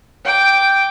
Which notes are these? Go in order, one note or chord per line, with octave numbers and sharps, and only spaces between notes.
G5 D6